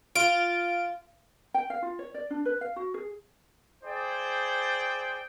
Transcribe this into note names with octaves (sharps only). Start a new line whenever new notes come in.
F4 D7
G5
F5
F4
C#5
D5
D4
B4
F5
F#4
G#4
E4 G#4 C5 D5 G5